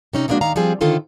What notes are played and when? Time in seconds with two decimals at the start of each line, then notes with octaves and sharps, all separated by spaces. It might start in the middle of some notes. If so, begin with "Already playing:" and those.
0.13 C3 C#4 D#4
0.28 F3 G#3 A#3 B3 D4 F#4
0.41 D#2 D#3 F5 A#5
0.56 F3 G3 C4 G#4
0.81 E2 D3 D#3 F4 A4 C5